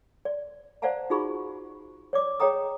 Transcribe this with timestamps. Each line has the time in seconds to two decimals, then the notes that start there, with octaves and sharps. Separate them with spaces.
0.25 D5
0.82 C5 D5 F5 F#5 A5 A#5
1.10 D#4 F4 F#4 G#4 B5 C#6
2.13 C#5 D5 D6
2.40 G#4 C#5 D#5 G5 A#5 D#6